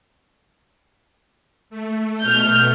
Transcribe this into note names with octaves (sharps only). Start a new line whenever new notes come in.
A3
B2 A3 F6 G6